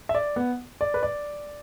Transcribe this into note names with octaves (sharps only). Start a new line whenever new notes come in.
E5
D5
B3
D5
B4
D5